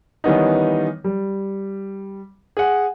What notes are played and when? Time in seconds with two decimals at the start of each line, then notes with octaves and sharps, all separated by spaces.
0.24 D#3 E3 G3 B3 C#4 D#4
1.04 G3
2.57 G#4 F#5